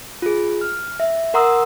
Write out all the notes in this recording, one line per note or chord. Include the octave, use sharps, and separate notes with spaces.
F4 G#4
F6
E5
A#4 F#5 A#5 C6 D#6 E6